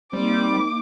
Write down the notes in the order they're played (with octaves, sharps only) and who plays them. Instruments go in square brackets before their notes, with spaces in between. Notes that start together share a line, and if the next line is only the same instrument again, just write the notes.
[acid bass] G3 [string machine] A#3 D#4 [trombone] C4 [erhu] D6